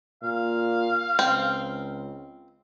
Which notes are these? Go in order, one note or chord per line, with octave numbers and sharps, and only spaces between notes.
A#2 F5
C#2 C4